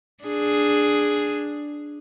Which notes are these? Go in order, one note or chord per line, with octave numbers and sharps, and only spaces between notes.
D4 G#4